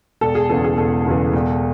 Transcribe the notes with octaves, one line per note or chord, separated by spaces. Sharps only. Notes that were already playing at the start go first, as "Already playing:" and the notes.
E1 A4
G#4
E2 C#3 E3 A4
G#4
E1 A4
E2 C#3 E3
E1